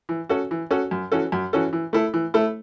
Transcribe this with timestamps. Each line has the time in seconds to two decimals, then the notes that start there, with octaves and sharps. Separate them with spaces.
0.09 E3
0.29 C#4 F#4 A4
0.51 E3
0.71 C#4 F#4 A4
0.91 F#2
1.12 E3 C#4 F#4 A4
1.32 F#2
1.53 E3 C#4 F#4 A4
1.73 E3
1.93 A3 E4 A4
2.14 E3
2.34 A3 E4 A4